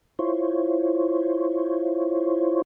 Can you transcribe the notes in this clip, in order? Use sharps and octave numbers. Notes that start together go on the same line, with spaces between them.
E4 F4 C5 C#5